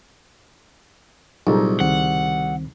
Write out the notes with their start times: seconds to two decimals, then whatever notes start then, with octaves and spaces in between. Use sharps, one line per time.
1.47 C2 A#2 F#3 D#4 F4 G#4 A4
1.80 C#2 D#3 C4 F#5